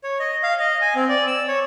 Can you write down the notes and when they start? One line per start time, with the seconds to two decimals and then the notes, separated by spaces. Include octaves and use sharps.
0.04 C#5
0.19 D#5
0.43 F5
0.60 D#5
0.82 G#5
0.95 C4
1.09 D5
1.27 E6
1.48 C#5